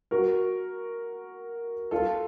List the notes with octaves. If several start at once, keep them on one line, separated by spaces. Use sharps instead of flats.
F#4 A#4
F4 A4